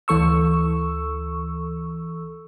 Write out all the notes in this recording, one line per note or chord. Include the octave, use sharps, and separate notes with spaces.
D2 E3 A4 C#6 E6